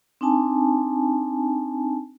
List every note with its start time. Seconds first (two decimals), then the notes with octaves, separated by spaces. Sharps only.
0.21 C4 D4 D#4 G#5 A5